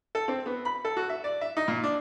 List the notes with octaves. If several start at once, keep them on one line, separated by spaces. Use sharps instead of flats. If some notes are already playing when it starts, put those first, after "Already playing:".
A4
C4
B3
B5
A4
F#4
E5
D5
E5
D#4
A#2
D4